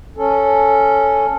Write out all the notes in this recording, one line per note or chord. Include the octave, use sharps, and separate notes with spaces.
C#4 A4